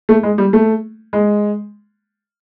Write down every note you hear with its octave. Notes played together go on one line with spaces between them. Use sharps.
A3
G#3
G3
A3
G#3